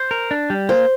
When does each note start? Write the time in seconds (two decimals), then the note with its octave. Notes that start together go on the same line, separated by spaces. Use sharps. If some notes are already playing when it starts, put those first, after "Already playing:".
Already playing: C5
0.11 A#4
0.31 D4
0.50 G3
0.69 A#3 C5